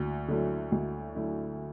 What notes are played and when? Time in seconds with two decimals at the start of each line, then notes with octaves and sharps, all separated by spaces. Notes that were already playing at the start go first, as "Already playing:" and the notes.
Already playing: D2
0.28 D3 F#3 A3 E4
0.72 D2
1.15 D3 F#3 A3 E4